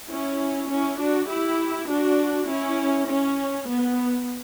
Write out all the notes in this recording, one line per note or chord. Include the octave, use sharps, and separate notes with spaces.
C#4 E4
C#4 E4
D4 F#4
E4 G4
D4 F#4
C#4 E4
C#4
B3